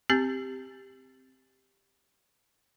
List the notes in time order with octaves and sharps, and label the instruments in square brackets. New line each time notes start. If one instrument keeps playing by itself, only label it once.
[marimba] C4 G4 G#5 G6 A6